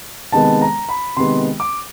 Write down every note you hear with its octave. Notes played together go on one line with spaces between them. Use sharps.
C3 D#3 G#3 B3 A5
A#5
B5
C3 D#3 G#3 B3 C6
D6